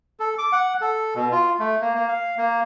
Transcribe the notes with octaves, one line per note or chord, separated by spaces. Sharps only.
A4
D6
F#5
A4
B2
F4
A3
A#3
A#3
F5
A#3